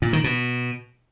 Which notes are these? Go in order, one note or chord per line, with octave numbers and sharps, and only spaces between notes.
A#2
D#3
B2